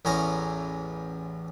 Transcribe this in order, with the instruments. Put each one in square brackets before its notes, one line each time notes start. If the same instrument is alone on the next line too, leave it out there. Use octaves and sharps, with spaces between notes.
[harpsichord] A1 E2 C#4 G#5 A#5